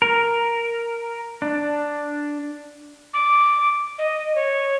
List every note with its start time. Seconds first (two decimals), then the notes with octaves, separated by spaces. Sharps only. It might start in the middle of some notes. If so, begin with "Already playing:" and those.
0.02 A#4
1.42 D4
3.14 D6
3.98 D#5
4.35 C#5